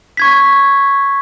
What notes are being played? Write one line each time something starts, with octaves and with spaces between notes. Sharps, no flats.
C#6 G#6 B6